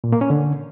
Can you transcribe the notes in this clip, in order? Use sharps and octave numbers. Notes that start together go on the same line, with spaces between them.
A#2
A#3
C#4
D3